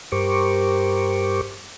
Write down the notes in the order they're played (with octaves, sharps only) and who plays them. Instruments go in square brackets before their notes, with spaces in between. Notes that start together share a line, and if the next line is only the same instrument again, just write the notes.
[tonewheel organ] G2 G4 A#4 C5 C#6 D6